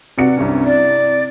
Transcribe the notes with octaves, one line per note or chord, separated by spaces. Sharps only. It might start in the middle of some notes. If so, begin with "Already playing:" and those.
C3 F#4 B4 D5 C#7
C2 G2 C#4
E4 D5